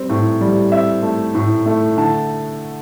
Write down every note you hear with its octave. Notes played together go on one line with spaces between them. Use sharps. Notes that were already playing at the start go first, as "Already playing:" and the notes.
Already playing: G3 C4
A2
G3
C4 E5
A3
A2
A3
D3 A5